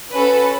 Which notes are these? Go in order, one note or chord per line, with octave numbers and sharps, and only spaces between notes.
C#4 F#4 A4 B4